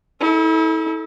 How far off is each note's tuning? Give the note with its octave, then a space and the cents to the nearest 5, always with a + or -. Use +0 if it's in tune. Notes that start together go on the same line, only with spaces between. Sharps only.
E4 -40 A4 -10